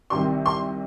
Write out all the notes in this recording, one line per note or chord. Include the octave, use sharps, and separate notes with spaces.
C2 C3 D#3 C6
C6